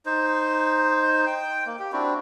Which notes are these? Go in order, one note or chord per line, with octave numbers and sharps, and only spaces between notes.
D#4 C5
G5
A#3
G4
C4 D4 E4 F#4